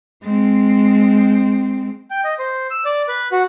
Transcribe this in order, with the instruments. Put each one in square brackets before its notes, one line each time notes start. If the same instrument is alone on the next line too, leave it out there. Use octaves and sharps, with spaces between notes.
[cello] G#3 C4
[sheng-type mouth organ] G5
D#5
C5
E6
D5
B4
F#4